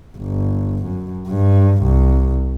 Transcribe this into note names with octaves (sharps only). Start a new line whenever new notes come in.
G1
F#2
G2
C2